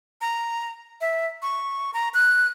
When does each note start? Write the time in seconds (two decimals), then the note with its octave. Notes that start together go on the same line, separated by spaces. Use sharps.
0.21 A#5
1.01 E5
1.42 C#6
1.94 A#5
2.14 F#6